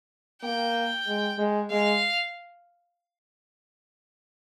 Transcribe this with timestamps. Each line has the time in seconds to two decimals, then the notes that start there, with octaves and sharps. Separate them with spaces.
0.43 A#3 G5
1.07 G#3
1.38 G#3
1.71 G#3 F5